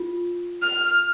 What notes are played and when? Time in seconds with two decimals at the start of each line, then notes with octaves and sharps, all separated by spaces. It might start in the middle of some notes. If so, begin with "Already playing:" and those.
Already playing: F4
0.62 F6